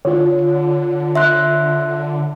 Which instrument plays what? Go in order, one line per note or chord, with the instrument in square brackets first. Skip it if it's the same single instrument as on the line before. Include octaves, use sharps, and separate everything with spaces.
[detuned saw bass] D3 [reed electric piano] F4 C#5
[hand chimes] E5 C6 F#6